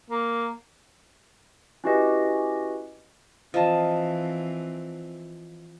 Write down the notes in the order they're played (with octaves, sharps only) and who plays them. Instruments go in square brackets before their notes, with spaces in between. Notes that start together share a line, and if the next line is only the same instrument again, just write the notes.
[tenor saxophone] A#3
[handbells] C#4 E4 F#4 G4 B4 D#5
[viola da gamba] E3 C4 [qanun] F3 [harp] D#5 A5